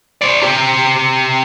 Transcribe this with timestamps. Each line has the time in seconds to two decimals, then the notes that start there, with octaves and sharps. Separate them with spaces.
0.21 C5 D5
0.43 C3 G4